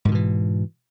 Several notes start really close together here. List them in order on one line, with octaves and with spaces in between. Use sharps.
G#2 D#3 B2 E3